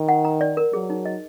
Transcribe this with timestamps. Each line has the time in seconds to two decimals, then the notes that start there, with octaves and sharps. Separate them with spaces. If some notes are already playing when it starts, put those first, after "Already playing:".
Already playing: D#3
0.08 F#5
0.25 A#5
0.41 D5
0.57 A#4
0.73 F#3 G#4
0.90 D#4
1.05 D#5